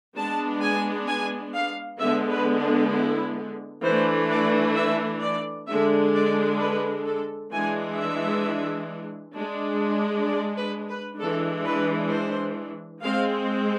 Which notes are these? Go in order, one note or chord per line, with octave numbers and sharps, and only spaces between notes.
G#3 B3 D4 A5
G#5
G#5
F5
D3 G#3 B3 E5
B4
D4
E4
E3 A3 D4 C5
D5
E5
D5
D3 G#3 D4 E5
D5
B4
A4
E3 G#3 D4 G#5
E5
G#3 D4
D5
B4
B4
E3 G#3 D4 A4
B4
C5
G#3 C4 F5